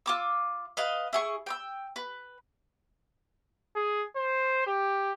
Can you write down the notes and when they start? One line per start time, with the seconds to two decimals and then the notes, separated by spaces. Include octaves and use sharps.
0.06 F4 D6 E6
0.77 B4 D#5 F5
1.13 E4 G#4 C#6
1.46 G5 B5 E6
1.96 B4
3.76 G#4
4.16 C5
4.67 G4